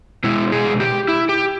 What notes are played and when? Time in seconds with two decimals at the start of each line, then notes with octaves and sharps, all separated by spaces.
0.24 B2 G#3 E4
0.52 G#4
0.80 G4
1.08 E4
1.29 G4